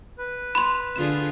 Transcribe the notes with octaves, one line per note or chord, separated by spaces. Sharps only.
B4
B5 C6
D3 F4 G#4 E7